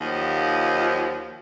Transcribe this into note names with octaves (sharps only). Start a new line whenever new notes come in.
D#2 F3 F#3 D#4 F4